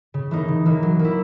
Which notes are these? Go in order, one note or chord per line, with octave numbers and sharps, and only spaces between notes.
C#3
E3 A#3 D#4
C#3
E3 A#3 D#4
F#3
A#3
E4